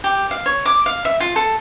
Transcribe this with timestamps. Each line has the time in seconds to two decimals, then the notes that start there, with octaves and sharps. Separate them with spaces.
0.04 G4
0.31 F5
0.46 C#5
0.65 D6
0.86 F5
1.05 E5
1.20 F4
1.36 A4